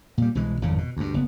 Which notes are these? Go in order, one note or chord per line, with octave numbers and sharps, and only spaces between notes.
A#2 G3
C2 B2 E3 G#3
G#1 F2 A2 C#3
B2
D2 G2
F#1 B3